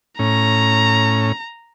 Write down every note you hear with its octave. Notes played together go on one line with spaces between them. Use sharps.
A2 C#4 A#5